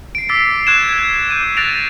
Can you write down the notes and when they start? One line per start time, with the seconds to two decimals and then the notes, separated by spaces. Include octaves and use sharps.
0.15 C7 D7
0.29 D6 E6 A6 B6 C7
0.67 C#6 F#6 G#6 E7
0.89 F#6 G#6
1.30 D6 G6 D#7
1.57 F#6 A6 A#6 D7 F7